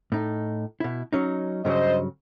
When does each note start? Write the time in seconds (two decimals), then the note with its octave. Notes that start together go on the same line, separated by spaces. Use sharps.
0.12 A2 D#4
0.80 B2 E4
1.13 F#3 C#4 D#4
1.65 G2 C#3 F#3 C5 D#5